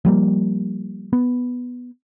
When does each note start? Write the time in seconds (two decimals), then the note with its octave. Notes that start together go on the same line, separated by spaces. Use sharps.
0.05 F3 G3 A#3
1.13 B3